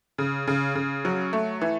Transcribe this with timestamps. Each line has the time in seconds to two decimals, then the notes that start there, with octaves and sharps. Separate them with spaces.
0.18 C#3
0.47 C#3
0.75 C#3
1.05 F#3
1.33 A3
1.61 E3